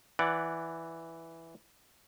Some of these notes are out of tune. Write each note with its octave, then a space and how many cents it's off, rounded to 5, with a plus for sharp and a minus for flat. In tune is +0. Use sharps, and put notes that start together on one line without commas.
E3 +0 D5 +0 F#5 +0